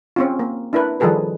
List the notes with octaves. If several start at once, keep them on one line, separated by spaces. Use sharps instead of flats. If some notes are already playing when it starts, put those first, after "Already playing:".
C4 C#4 F4
A#3
D4 E4 A#4 B4
D#3 F3 G3 G#4 A4 B4